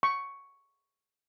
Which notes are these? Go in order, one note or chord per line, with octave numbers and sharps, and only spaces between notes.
C#6